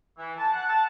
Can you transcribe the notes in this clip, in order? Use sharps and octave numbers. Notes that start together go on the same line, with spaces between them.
E3
A5
F#5
A5